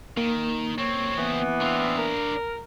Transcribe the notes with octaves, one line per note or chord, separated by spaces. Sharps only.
D#3 A#3
C#2 C4 C#5
E3 B3
C4 D4 F5
A#4